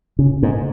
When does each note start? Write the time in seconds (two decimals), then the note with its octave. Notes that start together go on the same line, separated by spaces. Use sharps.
0.19 C#3
0.43 G#2